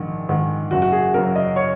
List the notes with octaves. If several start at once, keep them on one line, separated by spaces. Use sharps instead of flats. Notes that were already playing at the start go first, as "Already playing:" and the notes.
Already playing: A#1 G#2 D#3
G#2 D#3
F#1 F#4
F#4
G#4
F#2 C#3 A#4
D#5
C#5